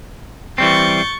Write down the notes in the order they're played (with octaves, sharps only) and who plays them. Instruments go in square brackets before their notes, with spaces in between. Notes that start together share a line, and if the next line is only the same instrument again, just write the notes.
[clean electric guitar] E3 G3 C4 [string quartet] C#6 G6 A6